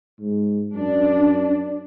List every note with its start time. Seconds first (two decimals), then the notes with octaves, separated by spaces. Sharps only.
0.20 G#2
0.74 F#2 D4